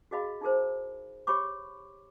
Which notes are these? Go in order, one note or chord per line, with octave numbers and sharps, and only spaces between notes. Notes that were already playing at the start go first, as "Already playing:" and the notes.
F#4 G#4 D#5 F5 B5
D#4 E4 G#4 A#4 C5
G4 C#5 B5 C#6 D6